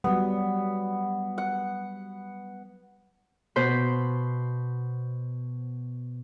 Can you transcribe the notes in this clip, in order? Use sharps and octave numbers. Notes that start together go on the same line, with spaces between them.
F#3 G3 B3
F#5
B2 C5 B5